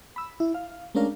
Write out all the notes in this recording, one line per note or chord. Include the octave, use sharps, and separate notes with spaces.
B5 E6
E4
F5
G#3 A3 C#4 D4 A#4 F5